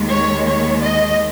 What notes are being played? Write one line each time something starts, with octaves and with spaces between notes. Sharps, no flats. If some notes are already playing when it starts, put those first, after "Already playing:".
Already playing: D#2 D#3 G#3
C#5
C#5
D#5